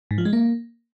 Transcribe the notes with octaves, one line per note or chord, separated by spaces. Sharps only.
G#2
F3
G#3
A#3